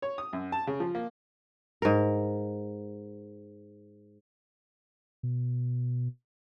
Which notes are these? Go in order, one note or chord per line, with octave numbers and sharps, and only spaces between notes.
C#5
D#6
F#2
A5
C#3
F3
A#3
G#2 A#4
B2